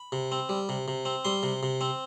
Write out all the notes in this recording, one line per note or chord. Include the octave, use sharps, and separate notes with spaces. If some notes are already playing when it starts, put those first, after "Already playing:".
Already playing: B5
C3
C4
G3
C3
C3
C4
G3 C6
C3
C3
C4